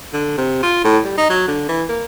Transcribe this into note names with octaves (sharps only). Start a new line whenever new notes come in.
D3
C3
F4
A2
G3
D#4
F#3
D3
E3
A#3